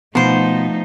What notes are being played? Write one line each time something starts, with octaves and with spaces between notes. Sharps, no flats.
B2 F3 A3 D#4 C5